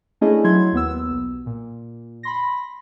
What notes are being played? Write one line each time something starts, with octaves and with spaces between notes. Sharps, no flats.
A3 C#4 D4 E4 G#4 D#5
F#3 E4 C6 G#6
D#2 B3 E6
B1
A#2
B5 C6 A#6